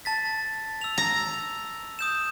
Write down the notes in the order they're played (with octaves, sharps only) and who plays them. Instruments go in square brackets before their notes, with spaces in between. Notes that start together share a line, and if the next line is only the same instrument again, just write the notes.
[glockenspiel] A5 A6 B6
E6 F7
[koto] A#5
[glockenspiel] D#6 G6 E7